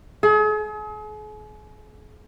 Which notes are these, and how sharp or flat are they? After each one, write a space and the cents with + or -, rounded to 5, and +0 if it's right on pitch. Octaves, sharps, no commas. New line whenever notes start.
G#4 +40